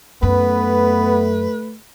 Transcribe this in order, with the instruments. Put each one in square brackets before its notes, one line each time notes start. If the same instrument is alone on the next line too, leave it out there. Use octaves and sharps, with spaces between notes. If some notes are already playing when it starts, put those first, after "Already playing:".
[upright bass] F#2 [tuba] A3 [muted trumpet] B3 [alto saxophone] B4